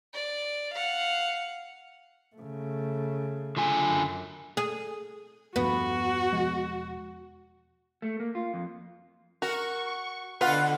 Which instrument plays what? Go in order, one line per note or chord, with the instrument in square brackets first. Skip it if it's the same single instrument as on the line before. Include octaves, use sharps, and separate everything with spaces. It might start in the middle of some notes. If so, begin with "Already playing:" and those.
[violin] D5
F5 F#5
[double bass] C#3 A3
[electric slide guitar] D3 F4 G#5
[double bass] F#2
[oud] G#4
[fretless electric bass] E2 G2 F3 [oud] B3 [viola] F#4
[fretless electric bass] E1 F3 G#3
[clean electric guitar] A3
A#3
F4
F2
[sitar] F#4 [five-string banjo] A#4 [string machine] C#6
[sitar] B2 F4 [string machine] D3 [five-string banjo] B4 [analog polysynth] F#5